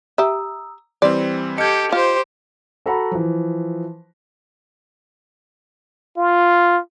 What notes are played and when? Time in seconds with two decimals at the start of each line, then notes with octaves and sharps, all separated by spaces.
0.18 G4 E5 A#5 D#6 E6
1.02 E3 G3 C4 D5 C6
1.58 G4 A4 D#5 F6 G6 G#6 C#7
1.92 F4 G4 C5
2.86 F#4 A4 F#5 A#5 B5
3.11 E3 F3
6.17 F4